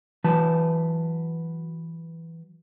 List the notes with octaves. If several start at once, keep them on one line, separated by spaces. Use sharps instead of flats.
E3 F#3 B4 A5